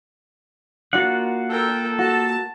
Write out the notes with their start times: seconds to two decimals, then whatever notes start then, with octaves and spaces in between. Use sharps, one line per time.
0.93 A#3 D4 F4 F#4 F#5
1.50 A4 A#4 G5
1.99 F#4 A5